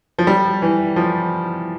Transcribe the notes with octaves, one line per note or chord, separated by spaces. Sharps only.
F3
G3
E3
F3